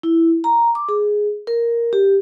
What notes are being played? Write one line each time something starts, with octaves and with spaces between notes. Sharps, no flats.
E4
A#5
D6
G#4
A#4
G4